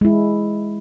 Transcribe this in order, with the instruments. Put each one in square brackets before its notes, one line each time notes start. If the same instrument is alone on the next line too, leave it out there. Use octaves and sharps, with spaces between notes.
[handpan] G#3 E4